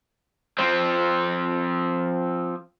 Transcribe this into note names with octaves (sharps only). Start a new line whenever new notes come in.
F3 C4